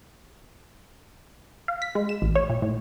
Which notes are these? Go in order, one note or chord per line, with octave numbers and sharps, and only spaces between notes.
F5
B6
G#3
E7
A1
C#5
A#2
A2